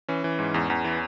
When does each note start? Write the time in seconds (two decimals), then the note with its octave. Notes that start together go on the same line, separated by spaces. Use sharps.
0.08 E3 C#4
0.24 E3
0.39 G#2
0.54 E2
0.70 E2
0.84 E3